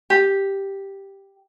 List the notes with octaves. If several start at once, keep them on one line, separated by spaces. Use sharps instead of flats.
G4